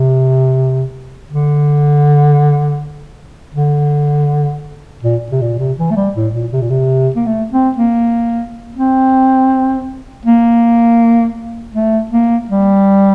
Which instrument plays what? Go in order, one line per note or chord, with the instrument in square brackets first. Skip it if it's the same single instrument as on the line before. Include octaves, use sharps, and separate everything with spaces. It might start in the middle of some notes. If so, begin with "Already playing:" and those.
Already playing: [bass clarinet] C3
D3
D3
A#2
C3
A#2
C3
E3
A3
G3
A2
A#2
C3
A#2
C3
A#3
A3
C4
A#3
C4
A#3
A3
A#3
G3